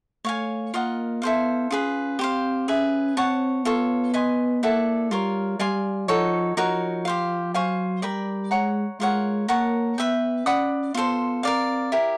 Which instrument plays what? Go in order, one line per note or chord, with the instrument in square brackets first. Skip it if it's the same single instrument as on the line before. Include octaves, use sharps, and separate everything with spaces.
[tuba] A3 [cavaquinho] C#5 F5 G#5
[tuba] A#3 [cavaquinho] F4 A#4 D#5 F#5
[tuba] B3 [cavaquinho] E4 A4 C5 F5
[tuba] C#4 [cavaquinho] F4 G#4 B4
[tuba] C4 [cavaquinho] G4 C5 F5
[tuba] C#4 [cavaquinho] G#4 B4 E5
[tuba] C4 [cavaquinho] C#5 F#5 A5
[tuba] B3 [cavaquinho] F4 A4 C#5
[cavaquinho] B4 D#5 G#5 C6
[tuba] A#3 [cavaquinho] E4 A4 D5 F#5
[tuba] G3 [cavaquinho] F4 A#4 C#5
[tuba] G3 [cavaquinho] D5 F5 G#5 C6
[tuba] F3 [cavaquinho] D#4 F#4 A4 C#5
[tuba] F3 [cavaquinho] D#4 F#4 A#4 C#5
[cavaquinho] G4 C5 F5
[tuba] F#3 [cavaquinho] C5 F5 G#5 C#6
[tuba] G3 [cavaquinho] A#4 D5 G5 B5
[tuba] G#3 [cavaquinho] C#5 F#5 A#5
[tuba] G#3 [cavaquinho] F4 A#4 C#5 F#5
[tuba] A#3 [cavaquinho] A#4 C#5 F#5 A5
[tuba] B3 [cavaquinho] B4 E5 G5
[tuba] C#4 [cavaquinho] D5 F#5 B5 D#6
[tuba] B3 [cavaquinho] F4 A4 C5
[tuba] C4 [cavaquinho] A#4 D5 F5
[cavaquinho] E4 G4 A#4